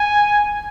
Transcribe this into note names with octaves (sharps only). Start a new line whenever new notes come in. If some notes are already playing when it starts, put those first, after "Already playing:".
Already playing: G#5